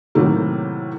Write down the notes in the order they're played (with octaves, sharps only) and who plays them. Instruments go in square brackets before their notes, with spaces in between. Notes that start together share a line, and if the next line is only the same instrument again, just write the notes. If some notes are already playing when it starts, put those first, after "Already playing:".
[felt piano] A2 C3 D#3 F#3 A3 A#3